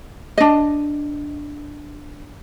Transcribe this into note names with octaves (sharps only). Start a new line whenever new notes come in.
D4 D#5